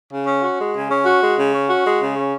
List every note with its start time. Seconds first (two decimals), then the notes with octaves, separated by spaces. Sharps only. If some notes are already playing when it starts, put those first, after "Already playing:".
0.11 C#3
0.27 C#4
0.43 F#4
0.58 G#3
0.74 C#3
0.90 C#4
1.06 F#4
1.22 G#3
1.37 C#3
1.53 C#4
1.69 F#4
1.85 G#3
2.00 C#3
2.16 C#4